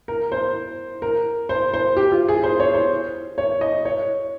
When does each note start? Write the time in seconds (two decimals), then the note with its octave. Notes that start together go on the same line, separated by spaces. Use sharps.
0.08 A#4
0.32 C5
1.02 A#4
1.49 C5
1.74 C5
1.97 G4
2.12 F4
2.28 G#4
2.44 C5
2.60 C#5
2.75 C5
3.38 C#5
3.61 D#5
3.85 C#5